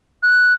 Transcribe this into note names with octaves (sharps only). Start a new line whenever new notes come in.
F#6